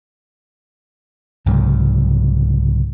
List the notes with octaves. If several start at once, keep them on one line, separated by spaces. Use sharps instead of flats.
C2 G#2 C#3 F#3